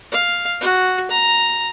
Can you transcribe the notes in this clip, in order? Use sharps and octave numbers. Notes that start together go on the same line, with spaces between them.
F5
F#4
A#5